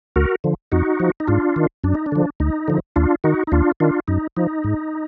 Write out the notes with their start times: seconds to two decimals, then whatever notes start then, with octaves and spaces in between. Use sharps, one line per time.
0.16 D2 F#4 A#4
0.44 D3 F3
0.72 F2 D#4 F#4
1.00 F3
1.20 D#4
1.27 G#2 D4 F4
1.56 D#3
1.84 F#2 D4
1.95 D#4
2.06 D4
2.12 D3 F3
2.40 D2 D#4
2.68 D3 F3
2.96 D#2 D4 F4
3.24 D#3 D#4 F#4
3.47 D#4
3.52 D#2 D4 F4
3.80 D#3 D4 F4
4.08 F#2 D#4
4.37 F3 D#4
4.64 G#2